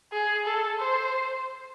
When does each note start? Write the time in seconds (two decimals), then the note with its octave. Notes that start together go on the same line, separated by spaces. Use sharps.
0.12 G#4
0.46 A4
0.80 C5